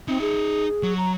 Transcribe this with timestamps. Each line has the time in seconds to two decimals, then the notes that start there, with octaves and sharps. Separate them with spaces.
0.08 C4 D#4 E5
0.21 G#4
0.83 F#3
0.97 A#5